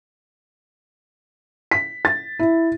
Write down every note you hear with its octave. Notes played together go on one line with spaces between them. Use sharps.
B6
A6
E4